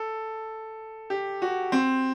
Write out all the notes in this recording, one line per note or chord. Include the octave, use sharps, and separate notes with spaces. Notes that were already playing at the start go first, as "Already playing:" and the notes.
Already playing: A4
G4
F#4
C4